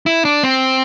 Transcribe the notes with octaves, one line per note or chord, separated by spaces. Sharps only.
E4
D4
C4